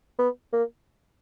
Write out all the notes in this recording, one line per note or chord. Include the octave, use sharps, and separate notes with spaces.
B3
A#3